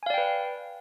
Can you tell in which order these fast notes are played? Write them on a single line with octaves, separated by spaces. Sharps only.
G#5 F5 D5 G5 B4